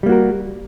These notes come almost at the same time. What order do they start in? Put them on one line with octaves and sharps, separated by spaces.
G3 A#3 F#4 A#4